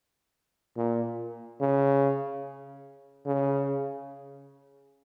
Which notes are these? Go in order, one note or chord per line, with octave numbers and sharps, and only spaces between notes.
A#2
C#3
C#3